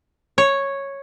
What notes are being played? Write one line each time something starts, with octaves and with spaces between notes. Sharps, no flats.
C#5